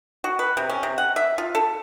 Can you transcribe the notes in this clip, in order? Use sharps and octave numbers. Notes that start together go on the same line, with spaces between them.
F#4
B4
C3
C#4
C3
F#5
E5
F4
A4